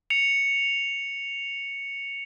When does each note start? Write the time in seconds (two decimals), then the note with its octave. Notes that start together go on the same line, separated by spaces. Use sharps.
0.10 C#7 F7